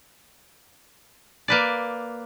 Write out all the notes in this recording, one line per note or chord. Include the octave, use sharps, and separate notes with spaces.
A#3 B4 D5